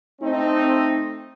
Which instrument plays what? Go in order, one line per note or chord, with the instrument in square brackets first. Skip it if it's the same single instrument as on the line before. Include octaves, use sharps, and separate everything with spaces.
[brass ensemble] A3 C4 D#4